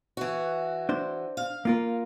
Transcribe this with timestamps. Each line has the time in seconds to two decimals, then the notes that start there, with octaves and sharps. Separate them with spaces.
0.17 E3 F#4
0.89 D4 C5
1.37 F5
1.65 A#3 F4 A#4